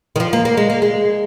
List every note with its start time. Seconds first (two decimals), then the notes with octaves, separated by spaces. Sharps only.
0.16 D#3
0.20 F3
0.33 A#3
0.45 A#3
0.57 G#3
0.70 A#3
0.82 G#3